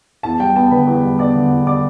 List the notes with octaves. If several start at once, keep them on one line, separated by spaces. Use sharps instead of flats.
E2 A5
G3 G5
B3 A5
D3 B4 B5
E2
G3
B3 D5 D6
D3
E2
G3 D5 D6